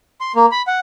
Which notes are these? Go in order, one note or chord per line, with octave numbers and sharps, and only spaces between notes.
C6
A#3
B5
F#5